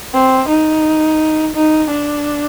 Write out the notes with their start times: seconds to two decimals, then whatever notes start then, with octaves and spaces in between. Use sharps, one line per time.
0.13 C4
0.48 D#4
1.55 D#4
1.91 D4